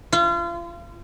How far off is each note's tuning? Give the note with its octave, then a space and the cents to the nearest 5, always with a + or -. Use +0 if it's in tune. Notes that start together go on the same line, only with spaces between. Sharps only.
F4 -35